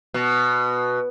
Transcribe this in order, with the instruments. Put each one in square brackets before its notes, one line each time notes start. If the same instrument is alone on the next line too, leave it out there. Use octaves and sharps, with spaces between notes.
[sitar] B2